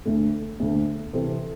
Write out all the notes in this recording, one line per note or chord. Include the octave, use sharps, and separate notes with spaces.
D2 D3 A3
D2 D3 A3
C3 E3 C4 A4